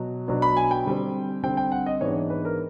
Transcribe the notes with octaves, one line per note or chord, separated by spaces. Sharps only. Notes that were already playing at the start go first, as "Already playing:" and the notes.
Already playing: B2 F#3
B2 F#3 B3 D4
B5
G#5
G5
D3 G3 C4
D3 G3 C4 G5
G5
F#5
D#5
G#2 E3 G#3 B3 D4 C#5
B4
A#4